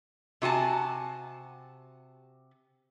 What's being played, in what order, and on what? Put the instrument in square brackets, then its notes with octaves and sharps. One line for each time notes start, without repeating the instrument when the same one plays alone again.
[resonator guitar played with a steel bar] C3 F#4 G#5 A5